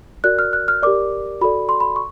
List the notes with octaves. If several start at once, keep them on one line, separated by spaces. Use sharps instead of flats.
F#4 A#4 D5 F#6
F6
F#6
F6
G4 A#4 D5 D6
F#4 A4 D5 B5
C6
B5
C#6